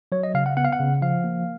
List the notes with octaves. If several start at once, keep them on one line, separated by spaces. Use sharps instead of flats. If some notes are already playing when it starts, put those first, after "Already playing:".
F#3 C#5
D#5
C#3 F5
F#5
B3 F#5
F5
F#5
C#3
F3 F5
A#3